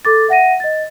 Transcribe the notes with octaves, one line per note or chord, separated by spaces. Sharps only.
A4 D6 A6
E5 F#5 A#6 D#7
D#5 A6